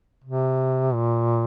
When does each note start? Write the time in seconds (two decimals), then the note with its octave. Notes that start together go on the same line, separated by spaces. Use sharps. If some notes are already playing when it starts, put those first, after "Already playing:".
0.24 C3
0.94 A#2